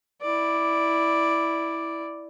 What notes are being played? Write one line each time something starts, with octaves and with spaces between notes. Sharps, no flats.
E4 D5